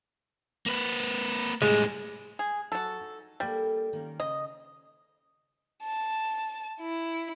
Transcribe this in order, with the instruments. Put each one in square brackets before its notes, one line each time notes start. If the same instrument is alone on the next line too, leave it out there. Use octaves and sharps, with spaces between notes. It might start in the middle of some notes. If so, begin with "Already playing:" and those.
[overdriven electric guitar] A#3 B4
[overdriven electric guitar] A2 G3 [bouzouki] G#3
[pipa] G#4
[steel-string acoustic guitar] F#3 [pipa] F#4 A4
[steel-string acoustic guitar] D#4
[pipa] G3 [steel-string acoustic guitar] A#3 D4 A4
[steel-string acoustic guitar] D#3 A#3 C#4
[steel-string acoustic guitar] C#3 [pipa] D#5
[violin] A5
E4